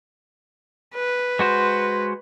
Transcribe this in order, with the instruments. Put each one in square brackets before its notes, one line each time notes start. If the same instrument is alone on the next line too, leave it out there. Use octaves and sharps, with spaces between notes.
[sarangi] B4
[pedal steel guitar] G#3 F#4 C5